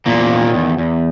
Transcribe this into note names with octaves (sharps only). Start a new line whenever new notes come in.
E2 A#2 A#3
D#3
E2
E2